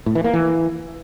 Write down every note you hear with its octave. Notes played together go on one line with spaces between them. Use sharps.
A2
E3
A#3
E3